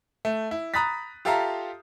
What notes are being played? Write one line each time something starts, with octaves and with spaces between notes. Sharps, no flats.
A3
E4
A#5 B5 D#6 F#6 A6 B6
F4 G4 A4 E5 F5 A#5